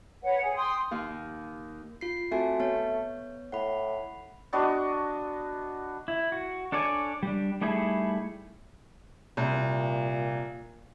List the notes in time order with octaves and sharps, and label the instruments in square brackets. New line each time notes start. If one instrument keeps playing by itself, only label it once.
[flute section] B4 C#5 F#5
G#4
G5 C6 D#6
[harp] D#2 F5
[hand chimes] F4 C7
[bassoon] A3 [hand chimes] C4 F#4 G#5
[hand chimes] B3 C#5
[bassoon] A2 [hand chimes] F#5 B5
[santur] B3 D4 F#4 D#5
[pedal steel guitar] E4
F#4
D4 A4 C#5 D5 G#5
G3 D4
G3 A3 D#4 E4 G#4
[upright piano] C2 [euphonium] A#2